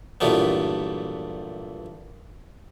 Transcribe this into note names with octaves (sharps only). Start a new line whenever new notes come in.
G2 A#2 E3 F#3 A3 B3